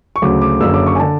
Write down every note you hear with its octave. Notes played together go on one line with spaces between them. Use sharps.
C#6
D2 C#3 F#3 D6
D6
F#1 F#2 D3 E6
D6
C#6
G#5
D3 A5